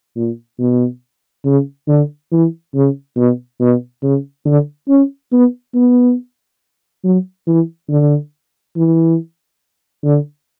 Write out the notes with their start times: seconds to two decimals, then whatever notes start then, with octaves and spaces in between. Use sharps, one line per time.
0.16 A#2
0.59 B2
1.45 C#3
1.88 D3
2.32 E3
2.74 C#3
3.17 B2
3.60 B2
4.03 C#3
4.46 D3
4.88 C#4
5.32 B3
5.74 B3
7.04 F#3
7.47 E3
7.89 D3
8.76 E3
10.04 D3